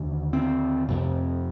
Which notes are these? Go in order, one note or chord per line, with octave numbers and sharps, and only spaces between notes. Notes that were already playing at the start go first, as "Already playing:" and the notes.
Already playing: D#2 D3
C4
F2 C3